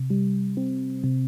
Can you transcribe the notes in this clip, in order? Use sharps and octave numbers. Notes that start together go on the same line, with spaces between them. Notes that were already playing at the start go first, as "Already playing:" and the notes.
Already playing: C3
G3
C4
C3